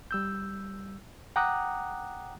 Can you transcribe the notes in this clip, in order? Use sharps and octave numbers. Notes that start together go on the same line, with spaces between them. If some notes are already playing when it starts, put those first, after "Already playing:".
G3 E6 G6
F#5 G5 A#5 D6 D#6 F#6